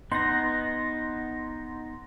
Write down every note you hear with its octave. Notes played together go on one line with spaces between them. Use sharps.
B3 D#4 C6 A#6